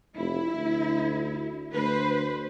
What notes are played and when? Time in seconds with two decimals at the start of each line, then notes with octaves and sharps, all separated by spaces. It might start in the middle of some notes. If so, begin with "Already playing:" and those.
0.17 F1 E4
0.53 D2
1.73 D2 B4 C5